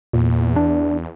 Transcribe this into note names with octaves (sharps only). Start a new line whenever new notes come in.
E2 A#2
D4